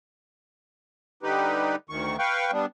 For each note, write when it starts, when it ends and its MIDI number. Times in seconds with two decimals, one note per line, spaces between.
1.23 1.76 50
1.23 1.76 55
1.23 1.76 63
1.23 1.76 67
1.23 1.76 71
1.90 2.16 38
1.90 2.16 51
1.90 2.16 85
2.19 2.51 71
2.19 2.51 77
2.19 2.51 79
2.19 2.51 85
2.52 2.66 55
2.52 2.66 59
2.52 2.66 62